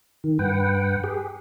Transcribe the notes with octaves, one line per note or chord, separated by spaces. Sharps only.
D#3
G2 B4 F#5 G5
G4 G#4